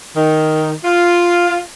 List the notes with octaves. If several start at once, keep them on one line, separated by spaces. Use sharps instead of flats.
D#3
F4